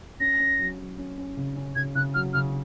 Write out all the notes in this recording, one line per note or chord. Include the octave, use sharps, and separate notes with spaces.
C#4 A#6
C#4
F#3
F#3
C#4
C#4
C#3
C#4
C#3 G#6
C#3 F#6
F#3 F6
C#3 F6